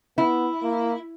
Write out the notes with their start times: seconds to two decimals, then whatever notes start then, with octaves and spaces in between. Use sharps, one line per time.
0.18 B3 E4
0.63 A#3